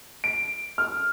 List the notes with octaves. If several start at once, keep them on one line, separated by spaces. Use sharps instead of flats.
D7
F6